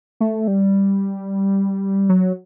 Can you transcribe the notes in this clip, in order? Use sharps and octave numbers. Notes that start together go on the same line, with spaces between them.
A3
G3
F#3